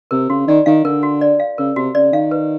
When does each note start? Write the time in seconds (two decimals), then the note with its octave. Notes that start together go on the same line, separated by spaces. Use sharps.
0.11 C3 A#4
0.30 C#3 F#4
0.47 D#3 D5
0.66 D#3 F5
0.85 D3 A#4
1.03 F#4
1.21 D5
1.40 F5
1.58 C#3 A#4
1.76 C3 F#4
1.95 C#3 D5
2.13 D#3 F5
2.31 B4